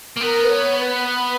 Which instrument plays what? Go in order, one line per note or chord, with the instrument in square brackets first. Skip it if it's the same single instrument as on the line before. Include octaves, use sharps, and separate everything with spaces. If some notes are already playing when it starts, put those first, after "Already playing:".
[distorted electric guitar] A#3
[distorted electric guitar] B3 [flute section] A#4
[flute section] B4
C#5
B4
B4